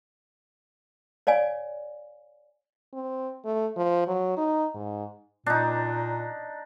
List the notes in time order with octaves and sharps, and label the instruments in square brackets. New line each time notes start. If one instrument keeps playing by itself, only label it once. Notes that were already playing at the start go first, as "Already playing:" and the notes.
[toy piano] C#5 D5 F5 G#5
[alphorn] C4
A3
F3
F#3
D#4
G#2
[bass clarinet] A#2 [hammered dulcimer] D4 D#4